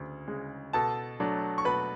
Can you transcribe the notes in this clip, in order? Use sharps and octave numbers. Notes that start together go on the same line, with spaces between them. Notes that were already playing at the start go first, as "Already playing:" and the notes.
Already playing: D2 C#3
C#3 G#3
B2 A4 A5
F#3 A3 D4
C#6
B2 B4 B5